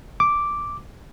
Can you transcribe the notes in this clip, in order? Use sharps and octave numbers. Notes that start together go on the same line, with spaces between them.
D6